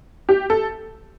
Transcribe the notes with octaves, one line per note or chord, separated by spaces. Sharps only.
G4
A4